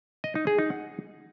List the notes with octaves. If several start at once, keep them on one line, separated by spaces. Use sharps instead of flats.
D#5
D#4
G#4
D#4
F#5